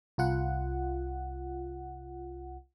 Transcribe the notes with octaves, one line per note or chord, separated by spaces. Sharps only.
C2 F4 F#5